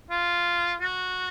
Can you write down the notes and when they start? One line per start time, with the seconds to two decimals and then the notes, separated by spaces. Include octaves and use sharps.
0.10 F4
0.81 F#4